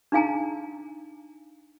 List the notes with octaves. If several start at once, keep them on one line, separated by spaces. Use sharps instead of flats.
D4 D#4 F5 G#5 A#5